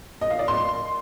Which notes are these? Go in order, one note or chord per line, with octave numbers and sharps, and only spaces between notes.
D#5
F5
D5
C6